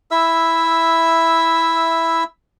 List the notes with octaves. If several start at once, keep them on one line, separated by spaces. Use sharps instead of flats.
E4 E5 E6